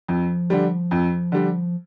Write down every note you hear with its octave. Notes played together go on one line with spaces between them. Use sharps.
F2 F3
D3 G3
F2
D3 G3